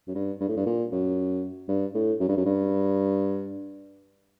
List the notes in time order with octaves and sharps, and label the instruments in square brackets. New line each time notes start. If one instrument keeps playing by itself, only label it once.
[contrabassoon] F#2
G2
G2
A2
G2
A#2
F#2
G2
A2
F#2
G2
F#2
G2